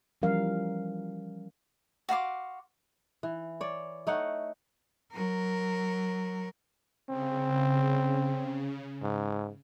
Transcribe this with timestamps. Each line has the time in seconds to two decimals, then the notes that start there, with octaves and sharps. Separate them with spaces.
0.22 E3 F3 G3 C#4 A#4 F5
2.09 F#4 F5 C6 D6
3.23 E3
3.61 C#5 D5
4.07 A3 D#4 C#5 F#5
5.12 F#3 A#4
7.09 C#3 C4
9.02 G#2